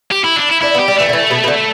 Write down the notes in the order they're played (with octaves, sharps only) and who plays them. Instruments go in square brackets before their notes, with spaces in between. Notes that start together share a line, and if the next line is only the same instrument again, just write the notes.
[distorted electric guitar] G4
E4
D4
E4
[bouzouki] D4 [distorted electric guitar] E4
[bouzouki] B3
[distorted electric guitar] G4
[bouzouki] G3
[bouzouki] E3 [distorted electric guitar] A3
[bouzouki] D3
E3
B2
B2
D3